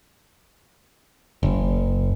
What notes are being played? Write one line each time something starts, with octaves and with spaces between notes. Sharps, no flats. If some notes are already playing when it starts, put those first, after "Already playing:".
F#1